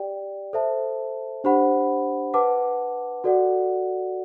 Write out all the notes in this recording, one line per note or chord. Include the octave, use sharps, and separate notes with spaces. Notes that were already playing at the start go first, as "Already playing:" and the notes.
Already playing: G4 D5 G5
A4 C5 E5 A5
D4 G4 C5 F#5 B5
B4 F#5 A5 D6
F#4 A4 D5 F#5